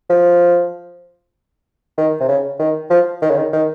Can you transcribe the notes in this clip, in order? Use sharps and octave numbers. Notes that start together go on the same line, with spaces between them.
F3
D#3
C3
C#3
D#3
F3
D#3
C#3
D#3
D#3